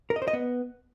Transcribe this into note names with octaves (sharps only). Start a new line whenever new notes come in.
A#4
D#5
C5
D#5
B3